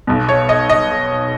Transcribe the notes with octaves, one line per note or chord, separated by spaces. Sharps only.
B1 B2
C#5
D#5
D#5